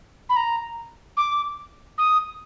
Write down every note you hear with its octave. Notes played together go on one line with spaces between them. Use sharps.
B5
A#5
D6
D#6